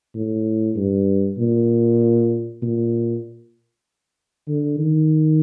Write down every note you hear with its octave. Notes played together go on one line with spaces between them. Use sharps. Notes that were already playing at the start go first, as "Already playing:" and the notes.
A2
G2
A#2
A#2
D3
D#3